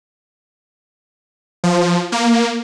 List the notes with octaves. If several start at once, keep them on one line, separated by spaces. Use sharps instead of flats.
F3
A#3